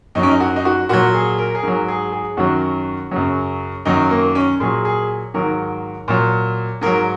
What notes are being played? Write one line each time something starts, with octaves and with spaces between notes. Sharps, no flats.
F#2 F#3 D#4
C#4
D#4
F#4
D#4
F#4
A#2 F#3 F#4
G#4
A#4
G#4
G#2 F#3 A#4
G#4
G#4
F#2 D#3 F#3 F#4
F#2 C#3 F#3
F#2 D#3 F#3 D#4
A#3
C#4
A#2 F#3 G#4
G#4
G#2 D#3 F#3 A#4
A#2 F#3
G#2 F#3 A#4